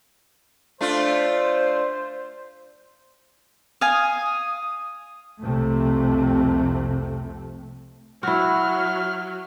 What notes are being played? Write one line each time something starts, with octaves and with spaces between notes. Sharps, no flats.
A3 D4 F4 C5
F5 G#5 D#6
C2 F2 C3 A3 C4
F#3 E4 F#4 F6